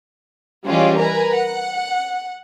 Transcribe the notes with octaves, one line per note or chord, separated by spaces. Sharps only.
E3 G3 G#3 C#4 F4 G4
A#4 B4 G#5 A#5
F#5